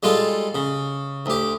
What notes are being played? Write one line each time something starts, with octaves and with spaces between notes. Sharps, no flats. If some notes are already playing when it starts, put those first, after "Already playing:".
G3 G#3 F4 A4
C#3
D2 G4